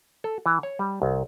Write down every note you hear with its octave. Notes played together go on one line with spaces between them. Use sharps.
A4
E3
C#5
G3
C2